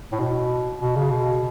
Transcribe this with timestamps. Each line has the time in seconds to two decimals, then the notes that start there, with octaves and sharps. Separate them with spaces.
0.12 A2
0.19 B2
0.80 B2
0.95 C#3
1.10 B2